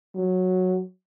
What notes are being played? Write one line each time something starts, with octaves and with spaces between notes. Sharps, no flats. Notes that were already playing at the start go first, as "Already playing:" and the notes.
F#3